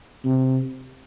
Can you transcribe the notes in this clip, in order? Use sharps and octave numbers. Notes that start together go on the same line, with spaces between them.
C3